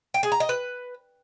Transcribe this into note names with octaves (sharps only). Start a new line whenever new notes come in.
G5
G#4
A#5
D#5
B4